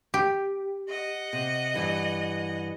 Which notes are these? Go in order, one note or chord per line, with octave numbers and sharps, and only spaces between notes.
G4
D#5 F#5
C3
G2 E3 G3